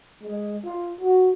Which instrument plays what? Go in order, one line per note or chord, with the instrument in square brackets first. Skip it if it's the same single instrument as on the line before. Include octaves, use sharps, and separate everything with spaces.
[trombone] G#3
F4
F#4